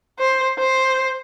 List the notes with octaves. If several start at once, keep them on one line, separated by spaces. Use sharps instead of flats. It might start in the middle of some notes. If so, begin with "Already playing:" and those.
C5
C5